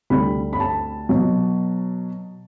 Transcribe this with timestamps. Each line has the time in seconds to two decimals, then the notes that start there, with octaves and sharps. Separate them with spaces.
0.10 D2 D3 G3 B5
0.53 B5
0.60 A5
1.09 B2 F#3